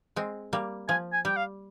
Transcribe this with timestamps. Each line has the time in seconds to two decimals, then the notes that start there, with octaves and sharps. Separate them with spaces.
0.16 G#3 C4
0.53 G3 A#3
0.89 F3 G#5
1.13 G#5
1.25 G3 G5
1.37 F5